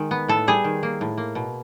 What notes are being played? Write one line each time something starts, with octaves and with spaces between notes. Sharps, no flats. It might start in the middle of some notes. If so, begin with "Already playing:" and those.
Already playing: D#3 G#3
B3
A2 A4
G3 G#4
D#3
A#3
A2
A#3
B2